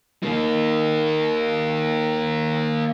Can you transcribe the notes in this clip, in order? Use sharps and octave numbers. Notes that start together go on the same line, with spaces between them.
A#3 D#4